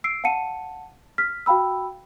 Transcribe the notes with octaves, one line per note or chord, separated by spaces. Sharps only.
E6 C7 D7
F5 F#5 A5 C#7 D#7
F6 B6
F#4 F5 G5 B5 E6